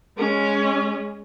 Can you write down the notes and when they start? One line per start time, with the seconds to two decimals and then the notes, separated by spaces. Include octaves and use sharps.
0.18 G#3 C#4